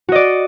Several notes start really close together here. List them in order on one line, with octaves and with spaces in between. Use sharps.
F#4 D#5 D5